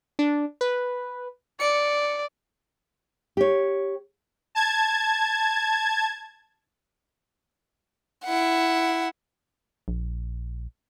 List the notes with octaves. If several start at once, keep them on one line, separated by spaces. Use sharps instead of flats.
D4
B4
D5 C#7
G4 C#5
A5 G#6
E4 F#5
A#1